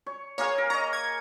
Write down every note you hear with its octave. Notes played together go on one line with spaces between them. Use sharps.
C#5
A#3 G#4 C#5 F5
A#4
C#5 D#5 A#5
G#6